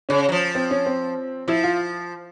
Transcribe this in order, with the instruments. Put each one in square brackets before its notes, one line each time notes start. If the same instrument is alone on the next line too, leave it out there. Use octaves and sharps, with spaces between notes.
[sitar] C#3 [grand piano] C#4
[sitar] F#3
F3
[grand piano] C4
C#4
C4
[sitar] F3 [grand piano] E4
[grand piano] F4